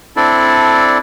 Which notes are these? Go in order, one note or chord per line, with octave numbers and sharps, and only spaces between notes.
C4 D4 E4 A4 D5